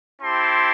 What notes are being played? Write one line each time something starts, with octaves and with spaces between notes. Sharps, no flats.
C4 E4 G4 A5 C6